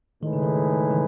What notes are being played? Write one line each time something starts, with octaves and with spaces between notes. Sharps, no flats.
A2 D#3 G#3 D#4 G#4 B4
C#3
D#3
C#3 E3